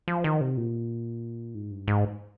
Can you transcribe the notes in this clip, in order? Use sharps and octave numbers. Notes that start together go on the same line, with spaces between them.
F3
D#3
C3
A#2
G#2
G2
G#2